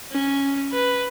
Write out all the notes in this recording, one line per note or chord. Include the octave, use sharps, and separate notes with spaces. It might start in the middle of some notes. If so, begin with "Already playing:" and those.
C#4
B4